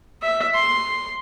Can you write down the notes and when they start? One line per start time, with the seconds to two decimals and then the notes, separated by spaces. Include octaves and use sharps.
0.22 E5
0.55 C6